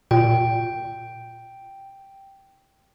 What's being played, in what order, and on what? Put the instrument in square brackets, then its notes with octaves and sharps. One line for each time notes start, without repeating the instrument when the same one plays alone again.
[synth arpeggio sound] A#2 [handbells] G5